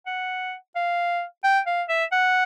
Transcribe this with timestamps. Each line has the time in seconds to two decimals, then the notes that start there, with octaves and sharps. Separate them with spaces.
0.07 F#5
0.75 F5
1.44 G5
1.67 F5
1.89 E5
2.12 F#5